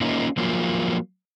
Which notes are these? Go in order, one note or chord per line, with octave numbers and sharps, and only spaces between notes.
A#3 C#4 D#4 F4
F3 F#3 A#3 F4